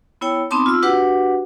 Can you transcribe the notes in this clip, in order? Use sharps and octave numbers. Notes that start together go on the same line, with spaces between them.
B3 E4 C#5 G5
B3 C4 D#4 A5 C6 D6
F4 E6
D4 F#4 G4 B4 F#5